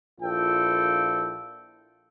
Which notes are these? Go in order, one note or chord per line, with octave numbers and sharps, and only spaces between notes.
A#1 E4 F4 A4 G5